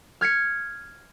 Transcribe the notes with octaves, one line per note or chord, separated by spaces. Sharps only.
F6 G#6 B6 C#7